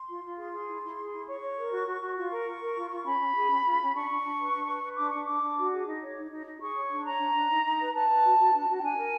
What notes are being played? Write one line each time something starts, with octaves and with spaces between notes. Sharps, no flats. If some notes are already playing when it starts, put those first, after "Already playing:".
Already playing: C6
F4
F4
G#4 C6
G#4
E4
E4
G#4
E4
C#5 C#6
C#5
A#4
F#4
F#4
F#4
F4 C#6
A#4
F4
A#4
F4
F4
C#4 B5
C#4
G#4
C#4
F4
C#4
D4 C#6
D4
D4
B4
D4
B4
B4
D4 D6
D4 C#6
D4 D6
D4
F#4
G#4
D#4
C#5
D#4
D#4
D#4
G#4 C#6
C#5
D4
C#5 A#5
D4
D4
D#4
D#4
B4
B4 A5
B4
F#4
F#4
D4
F#4
G5
D4 G#5
A#4